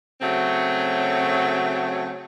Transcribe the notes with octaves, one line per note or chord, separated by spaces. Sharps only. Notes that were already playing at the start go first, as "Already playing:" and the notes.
C#3 F#3 A3 C4